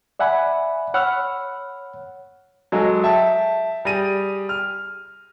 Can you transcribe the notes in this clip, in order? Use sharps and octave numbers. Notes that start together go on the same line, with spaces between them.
D5 E5 F#5 G#5 B5
C#5 F#5 B5 E6 F6
F#3 G#3 A4 D#5 G#5
E5 G5 A5
G3 G#4 A#6 D#7
F6